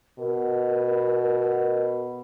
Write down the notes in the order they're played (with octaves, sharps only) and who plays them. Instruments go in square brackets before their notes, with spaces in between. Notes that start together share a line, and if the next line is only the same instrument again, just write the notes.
[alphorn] B2 [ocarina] A#4